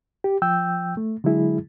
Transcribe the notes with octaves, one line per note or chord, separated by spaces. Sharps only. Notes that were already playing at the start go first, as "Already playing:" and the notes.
G4
F3 G5 E6 G6
A3
D3 F#3 G#3 E4 G#4